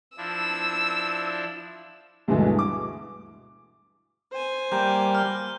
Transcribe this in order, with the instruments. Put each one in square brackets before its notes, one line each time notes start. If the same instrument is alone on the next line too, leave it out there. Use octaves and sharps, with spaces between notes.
[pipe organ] F3 D4 E4 [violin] E6
[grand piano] D2 G2 B2 E3 G#3 A3
D6
[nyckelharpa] C5 G#5
[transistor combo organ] G3 A#3 [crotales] G6
[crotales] F6